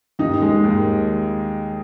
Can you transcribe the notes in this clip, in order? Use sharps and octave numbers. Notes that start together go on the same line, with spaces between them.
D#2 D#4
G#3
D#2